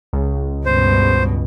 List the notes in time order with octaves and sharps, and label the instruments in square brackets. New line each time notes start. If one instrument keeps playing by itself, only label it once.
[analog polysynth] C#2
[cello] G2 B2 [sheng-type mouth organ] C5